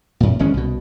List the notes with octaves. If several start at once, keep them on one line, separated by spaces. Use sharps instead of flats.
F#2 A#2
G#1 A2 G#3 C#4
C2 B2